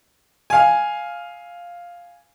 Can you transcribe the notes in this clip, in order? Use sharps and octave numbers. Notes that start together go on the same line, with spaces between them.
F5 G#5